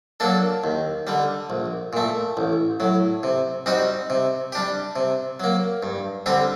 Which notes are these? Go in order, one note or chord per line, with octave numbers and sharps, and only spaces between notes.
F#3 A#3 D4 A4
D#2
D3 G3
A#1
A#2 A3
A1
A2 F#3
C3
G3 C4 D#4 F#4
C3
G3 D4 G4
C3
F#3 A#3
G2
D3 G3 C4 G4